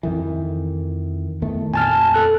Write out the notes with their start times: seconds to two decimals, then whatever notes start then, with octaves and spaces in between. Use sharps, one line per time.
0.03 F2 D#3 E3
1.42 E2 D#3 A3
1.74 F2 A#2 G#5 A5 F6
2.14 A4 F#6